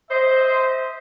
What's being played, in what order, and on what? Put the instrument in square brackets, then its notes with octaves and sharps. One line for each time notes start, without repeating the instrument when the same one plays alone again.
[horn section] C5 D#5 E5